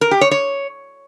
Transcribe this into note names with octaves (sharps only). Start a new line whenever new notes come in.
A#4
G4
C#5
C#5